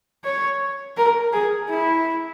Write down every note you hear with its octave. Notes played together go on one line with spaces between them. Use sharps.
C#5
A#4
G#4
E4